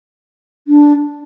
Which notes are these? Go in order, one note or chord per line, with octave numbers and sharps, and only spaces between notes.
D4